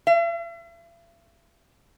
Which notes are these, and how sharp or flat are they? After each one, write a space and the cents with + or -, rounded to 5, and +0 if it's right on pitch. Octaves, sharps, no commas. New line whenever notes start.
E5 +45